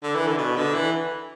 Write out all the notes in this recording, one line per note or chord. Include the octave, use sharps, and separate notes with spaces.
D3
E3
D3
B2
D3
E3